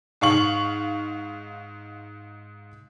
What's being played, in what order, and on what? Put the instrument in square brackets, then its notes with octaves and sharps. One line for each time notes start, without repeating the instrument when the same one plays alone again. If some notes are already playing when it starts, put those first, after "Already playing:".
[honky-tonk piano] G#2 F5 C#6 F#7